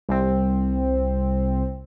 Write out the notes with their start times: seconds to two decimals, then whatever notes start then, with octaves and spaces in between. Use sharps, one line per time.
0.09 C2 C4